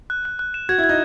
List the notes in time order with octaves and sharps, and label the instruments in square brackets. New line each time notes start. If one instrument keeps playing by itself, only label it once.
[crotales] F#6
F#6
F#6
E7
[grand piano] F#4 [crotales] G#6
[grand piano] E4
[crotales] G#6
[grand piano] D#4